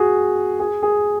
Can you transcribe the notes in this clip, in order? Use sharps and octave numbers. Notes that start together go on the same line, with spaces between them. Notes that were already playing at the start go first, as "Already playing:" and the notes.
Already playing: F#4 G#4
G#4
G#4